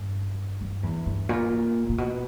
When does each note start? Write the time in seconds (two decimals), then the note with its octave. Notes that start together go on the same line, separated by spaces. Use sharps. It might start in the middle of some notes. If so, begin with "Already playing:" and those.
Already playing: G2
0.61 G2
0.83 E2
1.06 G2
1.29 A#2
1.89 A#2
1.98 B2